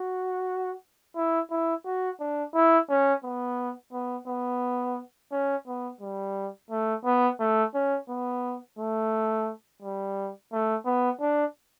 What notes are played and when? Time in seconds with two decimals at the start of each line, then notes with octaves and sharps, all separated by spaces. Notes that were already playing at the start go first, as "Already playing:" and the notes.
Already playing: F#4
1.16 E4
1.51 E4
1.86 F#4
2.20 D4
2.54 E4
2.90 C#4
3.24 B3
3.93 B3
4.28 B3
5.32 C#4
5.67 B3
6.01 G3
6.70 A3
7.05 B3
7.40 A3
7.75 C#4
8.09 B3
8.79 A3
9.82 G3
10.52 A3
10.86 B3
11.21 D4